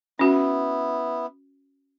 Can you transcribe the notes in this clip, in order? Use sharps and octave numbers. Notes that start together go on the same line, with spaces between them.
B3 C#4 E4 F#4